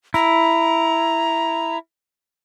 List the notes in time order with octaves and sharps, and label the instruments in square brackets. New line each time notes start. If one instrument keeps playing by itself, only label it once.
[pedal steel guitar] E4 [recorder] A#5